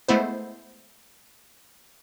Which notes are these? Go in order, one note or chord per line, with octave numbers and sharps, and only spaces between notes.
G#3 A3 B3 E4 C5